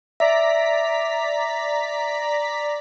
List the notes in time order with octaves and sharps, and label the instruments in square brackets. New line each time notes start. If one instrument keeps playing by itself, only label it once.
[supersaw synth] D5 A#5 B6 [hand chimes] E5